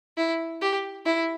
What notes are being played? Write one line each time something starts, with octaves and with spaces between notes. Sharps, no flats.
E4
G4
E4